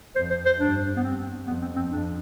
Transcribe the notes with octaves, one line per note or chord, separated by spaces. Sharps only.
F2 C5
C5
C5
G2 D4
B3
G2 C4
F2 B3
C4
C4
F2 D4